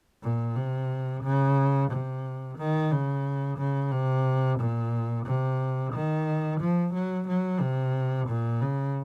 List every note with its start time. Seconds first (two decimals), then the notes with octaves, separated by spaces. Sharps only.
0.23 A#2
0.56 C3
1.23 C#3
1.91 C3
2.58 D#3
2.91 C#3
3.58 C#3
3.92 C3
4.59 A#2
5.26 C3
5.93 D#3
6.60 F3
6.94 F#3
7.28 F#3
7.60 C3
8.28 A#2
8.61 C#3